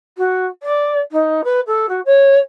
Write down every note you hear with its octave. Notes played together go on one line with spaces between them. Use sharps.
F#4
D5
D#4
B4
A4
F#4
C#5